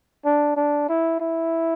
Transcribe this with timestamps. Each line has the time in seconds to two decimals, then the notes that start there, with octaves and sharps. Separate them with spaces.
0.25 D4
0.56 D4
0.89 E4
1.20 E4